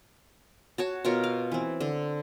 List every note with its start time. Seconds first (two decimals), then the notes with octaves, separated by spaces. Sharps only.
0.78 F#4 C#5 A5
1.05 B2 F4 A#4 C#5
1.24 F5
1.52 E3 C4
1.80 D3